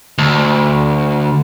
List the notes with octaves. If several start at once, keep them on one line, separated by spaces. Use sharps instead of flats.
D2